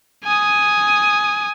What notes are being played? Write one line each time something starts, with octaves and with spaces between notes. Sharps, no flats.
G#5 D#6